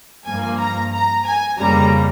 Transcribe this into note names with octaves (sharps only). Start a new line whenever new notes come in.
G2 F3 A#3 G#5
A#5
A#5
G#5
F2 C#3 G3 A#3 A#5